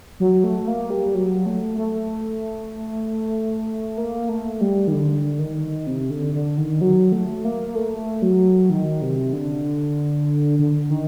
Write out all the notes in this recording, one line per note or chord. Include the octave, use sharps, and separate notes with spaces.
F#3
A3
A#3
G3
F#3
A3
A3
A#3
A3
G3
D#3
D3
D#3
C3
D3
D3
D#3
F#3
A3
A#3
A3
F#3
D#3
C3
D3
D3
D#3